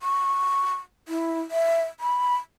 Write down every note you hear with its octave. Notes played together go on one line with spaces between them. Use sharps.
C#6
E4
E5
B5